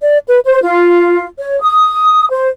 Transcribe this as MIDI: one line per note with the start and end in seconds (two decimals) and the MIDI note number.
0.01 0.18 74
0.28 0.39 71
0.45 0.60 72
0.64 1.26 65
1.37 1.58 73
1.61 2.29 87
2.30 2.47 72